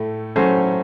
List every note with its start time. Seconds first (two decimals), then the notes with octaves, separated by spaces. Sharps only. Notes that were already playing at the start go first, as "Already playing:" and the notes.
Already playing: A2 A3
0.36 A2 F#3 A3 C#4 C5